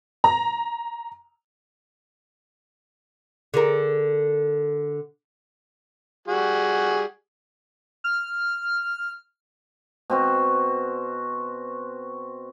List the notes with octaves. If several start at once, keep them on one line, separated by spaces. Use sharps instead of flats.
A#5
D3 G#4 A#4
G3 F#4 G#4
F6
B2 C4 F#4